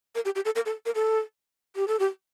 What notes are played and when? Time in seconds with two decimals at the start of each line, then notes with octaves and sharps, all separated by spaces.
0.15 A#4
0.25 G4
0.35 G4
0.45 A4
0.56 A#4
0.66 A4
0.86 A#4
0.95 A4
1.76 G4
1.88 A4
1.99 G4